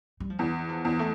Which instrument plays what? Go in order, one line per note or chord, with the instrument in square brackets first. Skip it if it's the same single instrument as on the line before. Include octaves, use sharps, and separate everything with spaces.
[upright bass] G3
F3
[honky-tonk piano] E2 [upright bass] E3
[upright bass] F3
[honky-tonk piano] E2
[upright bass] A3